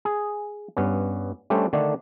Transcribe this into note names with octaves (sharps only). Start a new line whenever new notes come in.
G#4
G2 B3 C#4
G3 A3 C#4 D4 A4 C5
D3 D#3 A3 D4